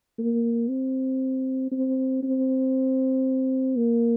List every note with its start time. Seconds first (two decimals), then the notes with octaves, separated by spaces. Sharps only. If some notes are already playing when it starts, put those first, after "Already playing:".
0.19 A#3
0.69 C4
1.72 C4
2.23 C4
3.76 A#3